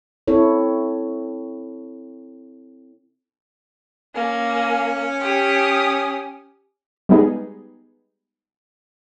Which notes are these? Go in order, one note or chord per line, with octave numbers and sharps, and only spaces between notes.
C4 E4 A4 C#5
A#3 C#4 G#5
G4 D#6
G3 G#3 B3 D#4 G#4